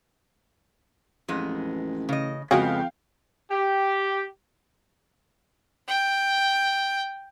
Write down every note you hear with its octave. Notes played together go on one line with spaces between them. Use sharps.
A1 F2 G#3 B3
C#3 D#5
F2 C#3 G#3 B3 F#4 G#4 F5 G5
G4
G5